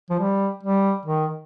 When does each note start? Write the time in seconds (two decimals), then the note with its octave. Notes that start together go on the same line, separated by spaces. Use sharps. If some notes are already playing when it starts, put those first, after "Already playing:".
0.10 F3
0.19 G3
0.63 G3
1.06 D#3